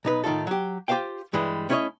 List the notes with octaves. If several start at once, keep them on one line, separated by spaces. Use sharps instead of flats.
B1 D#4 B4
A2 D#3 D#4 F4 A4
F#3 G4
F4 G4 A#4 C5 F5 G5
G2 E3 G3 G#3
A3 C#4 E4 C5 C#5 D#5